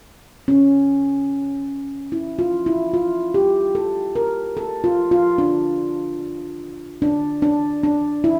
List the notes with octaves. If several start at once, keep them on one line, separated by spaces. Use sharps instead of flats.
C#4
E4
F4
E4
F4
G4
A4
A#4
A4
F4
F4
D4
D4
D4
D4
E4